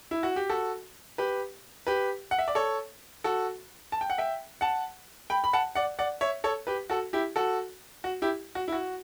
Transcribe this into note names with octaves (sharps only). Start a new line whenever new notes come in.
E4
F#4
G4
F#4 A4
G4 B4
G4 B4
F#5
E5
D5
A4 C#5
F#4 A4
A5
G5
F#5
E5 G5
F#5 A5
G5 B5
B5
F#5 A5
D5 F#5
D5 F#5
C#5 E5
A4 C#5
G4 B4
F#4 A4
E4 G4
F#4 A4
F#4
E4 G4
F#4
E4
F#4